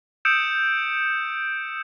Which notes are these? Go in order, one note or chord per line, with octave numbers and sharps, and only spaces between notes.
D#6 E6 G6 C#7 D7 E7